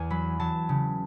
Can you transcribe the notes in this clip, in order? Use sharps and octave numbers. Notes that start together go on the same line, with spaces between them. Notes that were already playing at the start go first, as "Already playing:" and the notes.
Already playing: E2 G#5
F#3 B5
F#3 A5
C#3